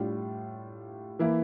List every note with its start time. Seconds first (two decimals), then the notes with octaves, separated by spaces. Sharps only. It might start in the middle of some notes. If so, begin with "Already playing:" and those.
Already playing: A2 G3 D4 F4
1.19 E3 A#3 E4